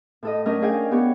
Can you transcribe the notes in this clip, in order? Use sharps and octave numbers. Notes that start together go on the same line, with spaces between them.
A2 A4 D#5
F#3 A3 C#4 D4 A#4 D#5
C#4 D4 G#4 F5 G5 G#5
B3 G4 C#5